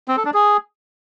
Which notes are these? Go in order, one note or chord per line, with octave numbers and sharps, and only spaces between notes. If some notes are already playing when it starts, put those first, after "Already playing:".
C4
A4
D4
G#4